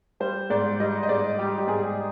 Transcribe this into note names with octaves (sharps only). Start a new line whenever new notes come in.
G3 C5
G#2 D5
G3 D#5
D#5
G#2 D5
G3 G4
G4
G#2 G#4